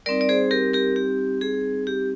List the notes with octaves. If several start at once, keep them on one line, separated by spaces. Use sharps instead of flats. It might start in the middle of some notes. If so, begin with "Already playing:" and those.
G3 C4 D#4 A#4 D5
D5
G#4 C5
G4 A#4
G4 A#4
G4
G#4
G4